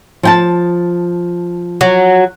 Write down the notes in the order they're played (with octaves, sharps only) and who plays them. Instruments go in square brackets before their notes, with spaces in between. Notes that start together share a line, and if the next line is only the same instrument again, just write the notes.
[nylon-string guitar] F3 G5 A5
[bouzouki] F#3